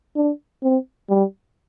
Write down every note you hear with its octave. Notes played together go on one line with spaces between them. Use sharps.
D4
C4
G3